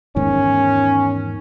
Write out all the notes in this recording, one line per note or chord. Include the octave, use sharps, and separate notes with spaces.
E2 G#2 D#3 C#4